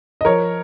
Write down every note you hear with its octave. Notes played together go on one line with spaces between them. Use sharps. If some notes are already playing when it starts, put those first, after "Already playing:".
D#5
F3 A#4 C#5